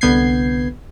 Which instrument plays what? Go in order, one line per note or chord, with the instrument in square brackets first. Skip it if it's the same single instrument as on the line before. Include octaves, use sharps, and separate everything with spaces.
[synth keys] C2 D3 B3 G6 G#6 C7